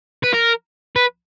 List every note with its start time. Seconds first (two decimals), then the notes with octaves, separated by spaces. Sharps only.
0.23 B4
0.33 A#4
0.96 B4